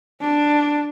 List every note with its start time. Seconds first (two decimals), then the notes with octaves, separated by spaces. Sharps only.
0.21 D4